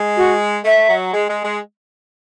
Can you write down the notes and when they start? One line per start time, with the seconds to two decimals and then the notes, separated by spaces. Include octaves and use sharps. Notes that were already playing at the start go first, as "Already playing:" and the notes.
Already playing: G#3
0.17 F#4
0.65 A3 E5
0.89 F#3
1.13 G#3
1.29 G#3
1.44 G#3